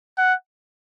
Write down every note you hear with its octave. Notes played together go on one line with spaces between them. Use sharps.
F#5